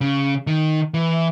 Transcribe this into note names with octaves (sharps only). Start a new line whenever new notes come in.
C#3
D#3
E3